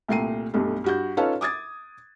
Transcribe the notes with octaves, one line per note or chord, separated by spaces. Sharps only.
C2 A#2 A3 G5 C7 D#7
B1 G2 A3
G2 F#4 G6
C#4 D#4 F4 A4 B4
D6 D#6 G#6 A6